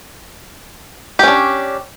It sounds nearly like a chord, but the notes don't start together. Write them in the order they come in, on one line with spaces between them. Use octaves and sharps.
G4 C#4 D4